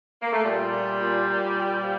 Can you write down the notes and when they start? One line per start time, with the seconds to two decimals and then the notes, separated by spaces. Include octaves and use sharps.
0.22 A#3
0.32 A3
0.43 A#2 G3
0.71 A#2
0.99 A#2
1.28 A#2
1.55 A#2
1.83 F3